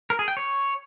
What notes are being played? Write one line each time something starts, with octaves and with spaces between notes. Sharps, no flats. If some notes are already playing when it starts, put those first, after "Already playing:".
A#4
G#4
G5
C#5